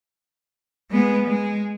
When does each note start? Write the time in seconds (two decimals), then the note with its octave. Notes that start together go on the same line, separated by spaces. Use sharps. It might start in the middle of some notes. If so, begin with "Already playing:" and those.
0.91 G#3 B3
1.27 G#3